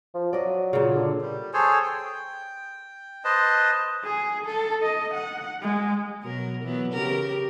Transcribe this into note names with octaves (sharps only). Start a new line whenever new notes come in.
F3
F#3 D5 D#5
A#2 C#3
D3
G3
G#4 A4 C5 C#5
G5
B4 C5 D#5 A5
G#4
A4
D#5
F#5
G#3
B2 F#3 A#4
E3 F#3 B3
C#3 G4 A#4